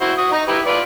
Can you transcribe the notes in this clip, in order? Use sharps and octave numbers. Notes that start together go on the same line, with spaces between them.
E4 F#4 C5
F#4 D#6
D#4 A#5
E4 G4 B4
F4 B4 D5